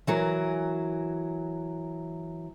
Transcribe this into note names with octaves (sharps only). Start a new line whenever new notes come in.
E3 F#3 A#4